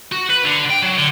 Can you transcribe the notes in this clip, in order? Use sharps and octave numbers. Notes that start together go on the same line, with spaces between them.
F#4
B4
D3
G5
F#3
D3